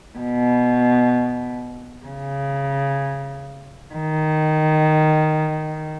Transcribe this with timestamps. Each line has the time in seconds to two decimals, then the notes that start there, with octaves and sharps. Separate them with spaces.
0.19 B2
2.06 C#3
3.94 D#3